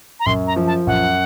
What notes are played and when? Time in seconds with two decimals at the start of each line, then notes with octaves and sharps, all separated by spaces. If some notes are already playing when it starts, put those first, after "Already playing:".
0.20 A#5
0.26 F#2 C6
0.47 A#5
0.56 F3
0.67 A5
0.87 F#2 F#5